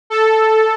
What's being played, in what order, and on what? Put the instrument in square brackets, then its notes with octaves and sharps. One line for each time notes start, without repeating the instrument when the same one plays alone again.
[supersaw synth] A4